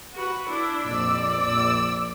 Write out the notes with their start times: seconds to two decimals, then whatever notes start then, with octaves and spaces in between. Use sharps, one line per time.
0.13 F#4 B4
0.48 D4 E4
0.83 A#1 F2 D5 E6
1.39 A#1 E6